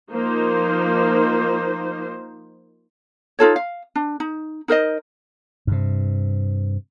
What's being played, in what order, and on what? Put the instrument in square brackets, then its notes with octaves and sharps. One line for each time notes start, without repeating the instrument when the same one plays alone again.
[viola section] F3 A#3 D#4 C5
[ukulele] D#4 F4 A4 C#5
F5
D4
D#4
D#4 A#4 C5 D#5
[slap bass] G2 C3